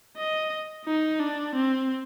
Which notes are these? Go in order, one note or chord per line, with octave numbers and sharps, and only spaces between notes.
D#5
D#4
D4
C4